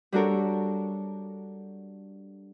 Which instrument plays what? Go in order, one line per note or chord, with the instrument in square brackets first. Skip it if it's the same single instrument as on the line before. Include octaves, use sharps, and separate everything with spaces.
[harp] G3 D4 F#4 A4 A#4 C#5